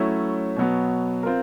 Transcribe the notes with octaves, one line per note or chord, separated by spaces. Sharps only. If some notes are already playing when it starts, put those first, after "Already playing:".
Already playing: F#3 A3 C#4 E4
B2 F#3 B3
C4 F4 A#4